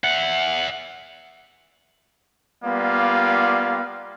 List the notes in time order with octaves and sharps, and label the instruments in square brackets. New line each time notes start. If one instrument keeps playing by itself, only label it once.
[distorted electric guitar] E5 F#5
[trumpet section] G3 A#3 B3 F4 D5 F5